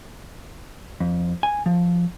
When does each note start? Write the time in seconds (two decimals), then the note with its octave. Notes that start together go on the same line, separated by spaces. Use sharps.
1.00 F2
1.43 G#5
1.66 F3